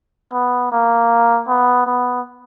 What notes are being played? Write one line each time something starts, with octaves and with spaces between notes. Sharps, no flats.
B3
A#3
B3
B3